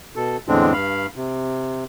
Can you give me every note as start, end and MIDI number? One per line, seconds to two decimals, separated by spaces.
0.16 0.37 47
0.16 0.37 69
0.48 0.73 40
0.48 0.73 45
0.48 0.73 50
0.48 0.73 56
0.48 0.73 60
0.48 0.73 62
0.73 1.06 43
0.73 1.06 77
0.73 1.06 83
1.16 1.84 48